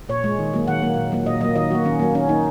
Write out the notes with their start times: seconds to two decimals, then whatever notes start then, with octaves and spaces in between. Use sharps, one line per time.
0.09 A#2 C#5
0.24 G#3
0.39 D#3
0.53 F#3 A#3
0.68 D#3 F#5
0.82 F#3 A#3
0.97 A#2
1.12 F#3 A#3
1.26 A#2 D#5
1.41 F#3 A#3 D#5
1.56 D#3 D#5
1.71 F#3 A#3 F#4
1.85 D#3 C#4
2.00 F#3 A#3
2.15 D#3 C#4
2.29 A#3 D#4